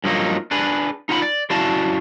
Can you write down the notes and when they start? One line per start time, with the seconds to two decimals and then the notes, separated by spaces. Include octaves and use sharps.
0.04 G2 F3 F#3 A#3 D#4
0.51 D4 G#4 B4
1.09 D#4 F4 F#5 B5
1.22 D5
1.50 F#2 E4 F#4 D5 F5 A5